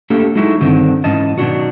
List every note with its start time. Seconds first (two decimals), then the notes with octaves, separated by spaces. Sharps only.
0.10 A3 A#3 D4 G4 A4 A#4
0.35 F#3 G#3 D#4 E4 F#4 A4
0.60 G2 D3 D#3 C4
1.04 G#2 E3 C#4 D#5 A5
1.38 B2 D#3 E3 F#3 D4 F#4